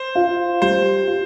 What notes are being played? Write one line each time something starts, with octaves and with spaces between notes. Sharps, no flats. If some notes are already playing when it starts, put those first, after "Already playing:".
Already playing: C5
F4
G3 C5
F4